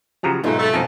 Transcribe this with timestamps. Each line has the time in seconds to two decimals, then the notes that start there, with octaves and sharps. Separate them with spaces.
0.23 C#3 F3 F#3 G4 A#5
0.44 B1 G#2 B2 A3 D#4 F4
0.57 A3
0.74 F2 B2 B3 C4 D#4 F5 G#5 A5